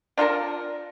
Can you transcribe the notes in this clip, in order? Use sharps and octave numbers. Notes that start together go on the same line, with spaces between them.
D4 F4 A4 A#4